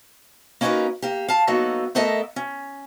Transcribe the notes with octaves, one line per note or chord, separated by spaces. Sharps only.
A#3 C#4 D#4 F#4 A#4 B4
A#3 G4
F5 A5
F#3 A#3 B3 D#4 F#4 A4
A3 B3 A4 A#4 D#5 E5
C#4